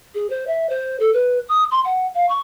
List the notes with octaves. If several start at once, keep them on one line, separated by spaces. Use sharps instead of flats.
G#4
C5
E5
C5
A4
B4
D#6
C6
F#5
F5
C#6